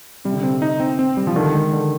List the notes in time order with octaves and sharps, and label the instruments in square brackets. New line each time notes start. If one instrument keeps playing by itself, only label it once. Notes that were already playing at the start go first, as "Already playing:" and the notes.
[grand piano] C3 [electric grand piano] G3
[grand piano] D3
[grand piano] C3 [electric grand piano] C4
[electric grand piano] D#4
C4
C4
G3
[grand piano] F3
[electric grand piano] D3 [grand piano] D#3
[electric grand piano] G#3
D3